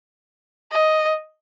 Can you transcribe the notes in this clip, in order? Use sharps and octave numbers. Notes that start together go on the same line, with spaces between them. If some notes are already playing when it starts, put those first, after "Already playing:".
D#5